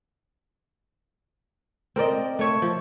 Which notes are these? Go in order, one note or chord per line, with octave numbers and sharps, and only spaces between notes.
C4 A#4 D5 D#5
A3 C#5 E5
F3